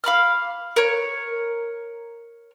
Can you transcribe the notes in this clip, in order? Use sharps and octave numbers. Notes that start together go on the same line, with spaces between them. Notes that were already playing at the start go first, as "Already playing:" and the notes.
F5 B5 D6 F6
A#4 C#5